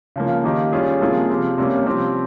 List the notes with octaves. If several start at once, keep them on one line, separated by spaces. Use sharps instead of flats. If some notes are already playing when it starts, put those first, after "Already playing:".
C#3 F3 A#3
D#3 A#3 D#4 G4
G3 C#4 F4 G#4
C3 F3 A#3 F4 G#4
F3 C4 G4
C3 G3 A#3 C#4
F3 C4 G4